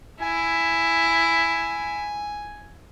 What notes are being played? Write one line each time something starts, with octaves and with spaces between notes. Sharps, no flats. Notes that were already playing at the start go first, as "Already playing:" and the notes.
E4 G#5